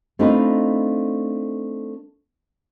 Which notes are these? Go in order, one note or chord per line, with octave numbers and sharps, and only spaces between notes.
A3 C4 D4 D#4 F4 B4